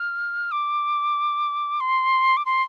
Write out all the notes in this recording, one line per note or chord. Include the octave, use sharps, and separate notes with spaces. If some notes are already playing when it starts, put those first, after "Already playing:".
Already playing: F6
D6
C6
D6
C6